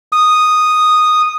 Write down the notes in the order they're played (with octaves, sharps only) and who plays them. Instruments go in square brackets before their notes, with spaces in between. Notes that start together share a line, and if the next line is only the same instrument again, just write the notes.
[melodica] D#6